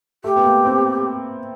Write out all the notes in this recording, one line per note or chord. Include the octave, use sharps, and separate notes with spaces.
A3 G4
B3
A#3
C4